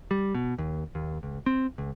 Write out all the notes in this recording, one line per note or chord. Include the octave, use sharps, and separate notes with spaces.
G3
B2
D#2
D#2
C#2
C4
C#2